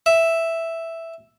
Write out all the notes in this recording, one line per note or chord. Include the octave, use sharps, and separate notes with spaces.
E5